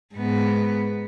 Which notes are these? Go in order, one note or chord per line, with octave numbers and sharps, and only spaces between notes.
G#2 B3